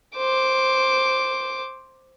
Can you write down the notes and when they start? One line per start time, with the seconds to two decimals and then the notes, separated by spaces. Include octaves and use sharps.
0.17 C5 D6